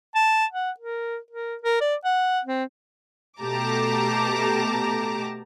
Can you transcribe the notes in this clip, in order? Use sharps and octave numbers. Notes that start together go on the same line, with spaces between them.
A5
F#5
A#4
A#4
A#4
D5
F#5
C4
B2 A3 G4 A5 A#5 D6